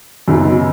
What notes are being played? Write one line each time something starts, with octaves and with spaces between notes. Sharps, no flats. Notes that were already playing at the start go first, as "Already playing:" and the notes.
F#2 C#3 F#3 B3 D#4